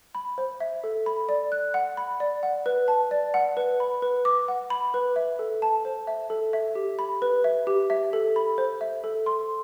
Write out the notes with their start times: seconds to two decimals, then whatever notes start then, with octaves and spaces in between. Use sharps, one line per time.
0.15 B5
0.38 C5
0.60 E5
0.84 A4
1.06 B5
1.29 D5
1.52 F#6
1.74 F#5
1.97 B5
2.20 D5
2.43 F#5
2.66 B4
2.88 A5
3.11 D5
3.34 F#5
3.57 B4
3.80 B5
4.02 B4
4.25 D6
4.48 F#5
4.70 B5
4.94 B4
5.16 E5
5.39 A4
5.62 A5
5.85 C5
6.07 E5
6.30 A4
6.53 E5
6.75 G4
6.99 B5
7.22 B4
7.44 E5
7.67 G4
7.90 E5
8.13 A4
8.36 B5
8.58 C5
8.81 E5
9.04 A4
9.26 C6